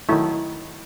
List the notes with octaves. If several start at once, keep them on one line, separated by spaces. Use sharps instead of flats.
D#3 F#3 A3 E4